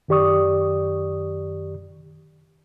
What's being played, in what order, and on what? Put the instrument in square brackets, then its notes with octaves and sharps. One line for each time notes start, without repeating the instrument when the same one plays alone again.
[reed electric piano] F#2 D#3 G4 D5 C#6 D#6